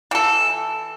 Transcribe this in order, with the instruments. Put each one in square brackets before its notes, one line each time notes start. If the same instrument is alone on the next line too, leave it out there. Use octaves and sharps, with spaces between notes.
[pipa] E3 A4